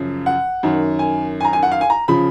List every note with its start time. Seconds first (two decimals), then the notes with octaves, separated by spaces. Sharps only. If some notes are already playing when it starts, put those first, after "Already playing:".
Already playing: F#2 C#3 F3
0.26 F#5
0.63 F#2 D#3
0.99 G#5
1.41 G#5
1.45 A#5
1.53 G#5
1.63 F#5
1.72 F5
1.81 G#5
1.90 A#5
2.08 C#3 F3 B5